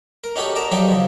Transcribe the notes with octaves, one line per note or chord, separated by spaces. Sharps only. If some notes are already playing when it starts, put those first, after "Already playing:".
A#4
C#4 D#4 F#4 G4 A4 C#5
A#4 D5 A5 A#5
F3 F#3 D#4 G4 A4 D5
C#3 F3